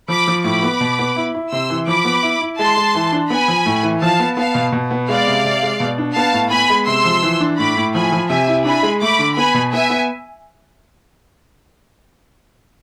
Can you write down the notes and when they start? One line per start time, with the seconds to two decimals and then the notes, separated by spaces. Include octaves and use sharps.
0.08 F3 B5 D6
0.27 F3
0.44 A2 B5 D6
0.63 B3
0.80 B2
0.99 B3
1.16 E4
1.35 E4
1.51 C3 C6 E6
1.70 E3
1.87 F3 B5 D6
2.05 B3
2.23 E4
2.41 E4
2.58 G#3 A5 C6
2.77 G#3
2.95 E3
3.12 D4
3.30 B3 G#5 B5
3.48 F3
3.66 A2
3.83 E3
4.01 F3 F5 A5
4.20 B3
4.37 B3 F5 A5
4.55 B2
4.72 B2
4.91 B3
5.08 G#3 D5 F5
5.27 C3
5.44 C3
5.62 G#3
5.80 B2
5.98 D4
6.15 B3 F5 A5
6.33 A2
6.51 B3 G#5 B5
6.70 G#3
6.87 C3 C6 E6
7.05 F3
7.23 E3
7.40 D4
7.58 A2 B5 D6
7.77 A2
7.94 F3 G#5 B5
8.12 F3
8.29 C3 E5 G#5
8.48 E4
8.65 D4 G#5 B5
8.83 G#3
9.01 A3 B5 D6
9.19 D3
9.36 B3 G#5 B5
9.54 B2
9.72 B3 E5 G#5
9.90 B3